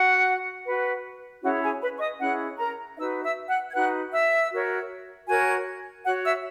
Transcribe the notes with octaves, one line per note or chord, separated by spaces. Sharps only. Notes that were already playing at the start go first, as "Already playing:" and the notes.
Already playing: F#4 F#5
F#4 B4
C#4 E4 F#4 G#4 C#5 F#5
G#4 G#5
B4 B5
C#6
D#5 D#6
C#4 E4 G#4 C#5 F#5 F#6
A#4 A#5
D#4 F#4 B4 E5 E6
E5 E6
F#5 F#6
G#6
D#4 F#4 B4 F#5 F#6
E5 E6
F#4 A#4 C#5
F#4 A#4 C#5 G#5 G#6
F#4 C#5 F#5 F#6
E5 E6